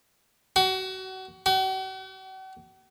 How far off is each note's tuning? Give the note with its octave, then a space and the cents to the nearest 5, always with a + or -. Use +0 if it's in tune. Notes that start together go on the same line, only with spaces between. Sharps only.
F#4 +30
F#4 +45